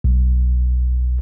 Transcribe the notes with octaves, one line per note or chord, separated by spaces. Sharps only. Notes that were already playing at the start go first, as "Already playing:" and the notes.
B1